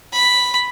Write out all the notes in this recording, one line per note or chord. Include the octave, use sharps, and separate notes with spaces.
B5